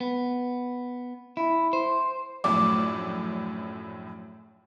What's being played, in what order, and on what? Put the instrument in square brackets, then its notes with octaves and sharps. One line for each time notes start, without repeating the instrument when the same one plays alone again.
[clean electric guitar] B3
E4
C5
[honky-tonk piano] A#1 F#2 A2 [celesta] D6